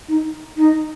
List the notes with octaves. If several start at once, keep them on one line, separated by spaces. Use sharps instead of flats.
D#4
D#4